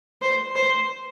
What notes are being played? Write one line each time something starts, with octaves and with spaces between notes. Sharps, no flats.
C5
C5